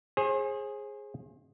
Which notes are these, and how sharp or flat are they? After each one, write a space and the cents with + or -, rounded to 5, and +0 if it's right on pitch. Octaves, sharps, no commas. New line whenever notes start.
G#4 +0 C5 +40